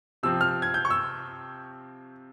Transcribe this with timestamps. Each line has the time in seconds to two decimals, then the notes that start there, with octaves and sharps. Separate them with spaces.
0.23 C3 F3 C4 E6
0.41 F6
0.62 G#6
0.74 G6
0.85 C#6
0.90 E6